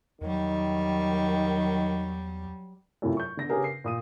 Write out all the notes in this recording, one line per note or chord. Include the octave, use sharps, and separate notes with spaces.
E2 D#3 F#3 G3
F#2 A2 C3 E4 F4
C#6 G6
D3 B3 A#6
C#3 C#4 G4 G#4 A#4 B4
C7
A#2 D#6 D#7